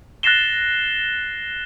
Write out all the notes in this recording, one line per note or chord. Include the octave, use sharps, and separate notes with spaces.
F#6 A6 A#6 C7 E7 G7